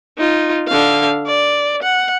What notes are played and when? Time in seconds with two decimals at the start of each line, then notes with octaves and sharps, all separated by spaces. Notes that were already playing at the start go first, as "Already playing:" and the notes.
0.18 D#4 F4
0.68 D3 F5
1.27 D5
1.83 F#5